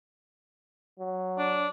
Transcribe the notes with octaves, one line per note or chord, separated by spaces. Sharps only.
F#3
D4